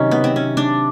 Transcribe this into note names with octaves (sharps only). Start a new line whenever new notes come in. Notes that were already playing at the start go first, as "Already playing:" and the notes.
Already playing: C3 D#3 F#3 C#4 D#4
B3
C4
C#4
D4